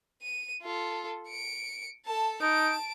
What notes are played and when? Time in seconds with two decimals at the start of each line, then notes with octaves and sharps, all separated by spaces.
0.22 D#7
0.62 F4 A4
1.28 C#7 D7
2.06 A4 A5
2.41 D#4 A5 D7